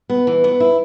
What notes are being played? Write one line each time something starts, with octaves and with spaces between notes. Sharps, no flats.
B3
E3
B3
E4